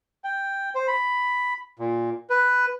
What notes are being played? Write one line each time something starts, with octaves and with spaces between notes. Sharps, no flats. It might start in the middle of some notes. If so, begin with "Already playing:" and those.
G5
C5
B5
A#2
B4